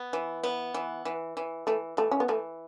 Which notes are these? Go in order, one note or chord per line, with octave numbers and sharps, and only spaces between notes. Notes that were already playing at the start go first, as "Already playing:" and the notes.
Already playing: B3
E3
B3
E3
E3
E3
E3 A3
E3 A3
C#4
B3
E3 A3